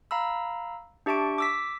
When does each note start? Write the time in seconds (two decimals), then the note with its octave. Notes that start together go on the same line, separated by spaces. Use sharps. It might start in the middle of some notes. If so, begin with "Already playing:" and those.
0.11 F5 A#5 B5 E6
1.06 D4 G4 E5 A5 C#6 D7
1.38 D6 E6 B6